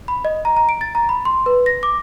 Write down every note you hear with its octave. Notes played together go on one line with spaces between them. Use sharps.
B5
D#5
A#5
A#5
D7
A6
A#5
B5
C6
B4
A#6
D6